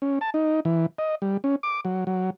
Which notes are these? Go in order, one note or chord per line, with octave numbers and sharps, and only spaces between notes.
C#4
A5
D#4
E3
D#5
G3
C#4
D6
F#3
F#3